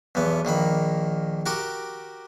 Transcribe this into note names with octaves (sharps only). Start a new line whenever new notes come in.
B1 E2 B3
A#1 D#3 A#3 B5
F#4 G4 A#4 D6